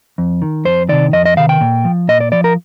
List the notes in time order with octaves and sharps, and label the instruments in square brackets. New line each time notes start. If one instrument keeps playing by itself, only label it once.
[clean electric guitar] F2
D#3
F2 C5
C3 D#3 D5
F2 D#5
D#5
C3 D#3 F5
G5
A#2
F3
A#2 D#5
D5
F3 D5
A#4